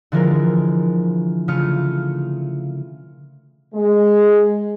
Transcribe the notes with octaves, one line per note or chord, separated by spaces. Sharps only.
D3 E3 F3 G#3 A#4
C#3 A3 F4 D#6 F6 C#7
G#3